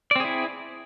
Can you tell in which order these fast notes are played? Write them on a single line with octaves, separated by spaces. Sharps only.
D5 C4 G#4 E4